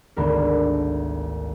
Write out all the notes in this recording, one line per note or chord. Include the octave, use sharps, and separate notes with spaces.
G#1 D2 B3 D4 A#4